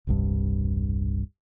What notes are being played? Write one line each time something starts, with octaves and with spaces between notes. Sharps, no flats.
E1 C2 G2